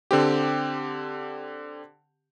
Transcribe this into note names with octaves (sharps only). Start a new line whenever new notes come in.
D3 C4 G4